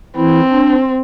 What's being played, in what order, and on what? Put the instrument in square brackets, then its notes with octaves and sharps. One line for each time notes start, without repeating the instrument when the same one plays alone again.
[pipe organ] E3 E4 [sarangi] C4
[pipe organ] D4